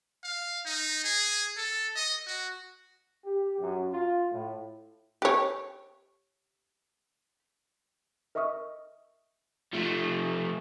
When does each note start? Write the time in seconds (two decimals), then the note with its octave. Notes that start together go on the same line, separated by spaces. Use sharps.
0.24 F5
0.66 D#4
1.04 G#4
1.57 A4
1.96 D#5
2.26 F#4
3.26 G4
3.59 F#2
3.93 F4
4.32 A2
5.22 G4 C#5
8.35 A#4 D#5 E5 C#6 D#6 F6
9.73 F3 A3